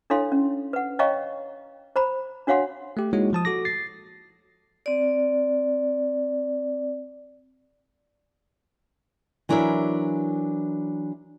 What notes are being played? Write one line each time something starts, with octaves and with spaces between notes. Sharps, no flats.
D4 E4 A4 C#5 F5 C6
C#4
B4 F#5
C#5 D#5 F5 G5 A#5 C#6
C5 A#5 B5
D4 F#4 C#5 F5 F#5 C6
A3 G4
G#3 A#3 D#4 E4 F#4 C#5
F3 A5 D#6
F#4 A4 D6 A#6
A6 C7
C4 D5
E3 F#3 D4 E4 A#4 E5